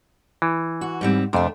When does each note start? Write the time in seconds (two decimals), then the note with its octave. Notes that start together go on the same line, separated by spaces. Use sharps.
0.42 E3
0.81 F#4
1.01 G#2 G3 C4
1.33 F2 C3 A3 D4